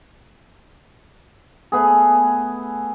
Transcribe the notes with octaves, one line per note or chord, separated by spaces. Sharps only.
A3 B3 G#4